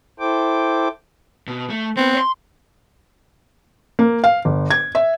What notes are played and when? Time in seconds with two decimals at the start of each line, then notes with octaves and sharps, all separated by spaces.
0.20 E4 A4 C5 G5 D6
1.47 B2
1.70 A3
1.97 B3 C4
2.14 C#5 C6
3.99 A#3
4.24 F5
4.45 G1
4.71 G#6
4.95 E5